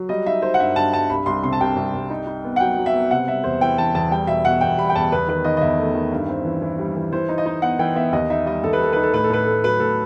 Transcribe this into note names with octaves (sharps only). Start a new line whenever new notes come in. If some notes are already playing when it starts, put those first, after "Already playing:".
Already playing: F#3
G3 D#5
D#4 E5
D#4 C5
F#5
G2 E5
G2 A5
G2 A5
C2 B5
C2 C6
C3 C6
A5
C2 G5
C2
C2
D#4
D#4
B3
F#5
F#3 G5
F#3
E5
B3
C3 F#5
G3 E5
E2 C5
E3 G5
E3 A5
E2 A5
G3 G5
B2 E5
B2 F#5
E2 G5
G3 B5
G5
E2 A5
E2 B4
D#3 B4
D#3 D#5
D#5
E2 E5
A3
D#3
G2
C4
E3
E3
G3
E3
E3 C5
D#4
D#5
D#4
B3 F#5
E3 G5
B3 E5
D#2 D#5
D#4 E5
G3 D#5
D#2 A4
B4
D#3 A4
D#4 B4
A4
A2 B4
A4
A2 B4
A3 A4
F#3 B4
A2 A4